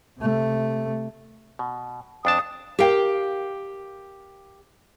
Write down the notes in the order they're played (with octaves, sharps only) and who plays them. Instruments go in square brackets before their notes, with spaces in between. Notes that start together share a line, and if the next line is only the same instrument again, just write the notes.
[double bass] C3 A3
[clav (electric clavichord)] B2
[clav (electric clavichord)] F2 D4 A5 [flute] D#6
[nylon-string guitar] G4 A#4 F5 G5